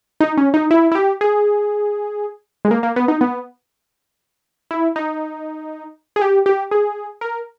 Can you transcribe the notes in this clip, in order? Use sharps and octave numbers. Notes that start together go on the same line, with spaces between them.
D#4
C#4
D#4
E4
E4
G4
G#4
G#3
A#3
A#3
B3
D#4
B3
E4
D#4
G#4
G4
G4
G#4
A#4